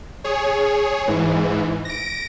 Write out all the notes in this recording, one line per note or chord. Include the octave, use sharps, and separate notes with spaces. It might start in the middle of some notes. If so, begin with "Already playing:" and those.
G#4 C#5
G#2 E3
A#6 D7